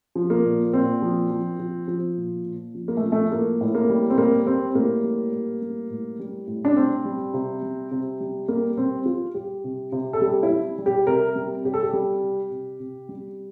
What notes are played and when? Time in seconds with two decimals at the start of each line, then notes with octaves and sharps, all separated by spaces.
0.15 F3
0.30 A#3
0.45 A#2
0.73 A#2 C4
1.02 F3
1.30 F3
1.59 F3
1.88 F3
2.17 A#2
2.45 A#2
2.74 F3
2.88 A#3
2.97 A3
3.03 F3
3.12 A3
3.32 A2 A#3
3.61 A2
3.75 A#3
3.89 G3
4.10 C4
4.18 G3 A#3
4.46 G3 C4
4.75 A2 A#3
5.04 G3
5.32 A2
5.62 G3
5.90 A2
6.19 G3
6.47 A2
6.65 D4
6.76 C3 C4
7.05 G3
7.34 C3
7.62 G3
7.91 C3
8.20 G3
8.48 G3 A#3
8.77 G3 C4
9.06 G3 F4
9.34 G3 G4
9.64 C3
9.92 C3
10.13 A4
10.21 G3 G4
10.43 E4
10.50 G3
10.79 G3
10.86 G4
11.07 C3 A#4
11.35 G3
11.64 C3 G4
11.74 A4
11.83 G4
11.93 G3
12.22 C3
12.51 C3
12.80 C3
13.09 G3